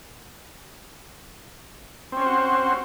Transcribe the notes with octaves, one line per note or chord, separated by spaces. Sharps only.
C4 C#4 F#4 C5